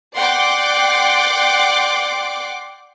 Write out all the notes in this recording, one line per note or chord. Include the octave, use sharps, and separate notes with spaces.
D5 F#5 G5 C6 D6